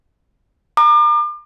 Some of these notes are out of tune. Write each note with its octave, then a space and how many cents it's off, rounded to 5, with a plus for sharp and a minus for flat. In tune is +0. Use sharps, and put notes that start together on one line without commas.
A#5 +0 D6 +40